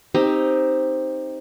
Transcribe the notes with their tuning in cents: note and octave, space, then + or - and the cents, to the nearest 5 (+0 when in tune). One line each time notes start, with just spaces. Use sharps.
C4 +0 D#4 +0 G4 +15